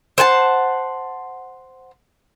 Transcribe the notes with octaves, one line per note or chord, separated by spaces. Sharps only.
C5 F#5 G#5 A5